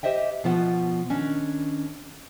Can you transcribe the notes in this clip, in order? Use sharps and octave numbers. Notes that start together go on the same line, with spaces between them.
G4 C5 D#5 E5 G5
B2 F3 B3 F4 E5 F#5
D#3 C#4 D4